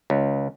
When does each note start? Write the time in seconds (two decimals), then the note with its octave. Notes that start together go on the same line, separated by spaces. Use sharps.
0.10 C#2